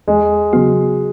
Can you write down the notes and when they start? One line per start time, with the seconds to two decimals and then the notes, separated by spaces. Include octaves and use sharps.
0.08 E2 G#3
0.53 C#3 F#3 B3 F#4